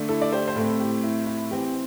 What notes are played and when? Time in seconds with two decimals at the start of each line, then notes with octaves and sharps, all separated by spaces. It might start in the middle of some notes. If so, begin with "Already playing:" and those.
Already playing: D3 A3 D4
0.08 E4 A4
0.22 D5
0.33 G4 C5
0.48 C5
0.56 A2 A3 C4 E4 A4
0.80 G4
1.03 E4
1.27 E4
1.51 E3 C4 G4